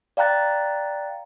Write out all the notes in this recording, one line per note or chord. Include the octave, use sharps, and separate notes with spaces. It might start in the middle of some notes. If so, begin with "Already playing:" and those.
D5 F5 G5 A#5 F#6 A6